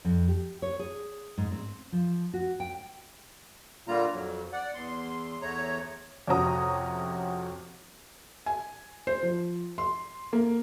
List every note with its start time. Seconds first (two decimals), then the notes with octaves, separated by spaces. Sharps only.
0.05 F2
0.28 G4
0.62 C#5
0.79 G#4
1.38 G#2
1.52 C4
1.92 F3
2.33 F#4
2.60 G5
3.88 A#2 D3 G3 A#3 F4 A#5
4.13 F2 F#3
4.53 D5 F#5
4.75 E2 C6
5.42 E2 A3 C#5 A#5
6.28 F2 C3 C#4 F#4 A#5 D#6
8.46 G#5
9.07 C5
9.23 F3
9.78 C6
10.33 A#3